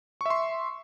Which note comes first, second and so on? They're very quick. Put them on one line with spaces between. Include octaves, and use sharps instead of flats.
C#6 E5 C6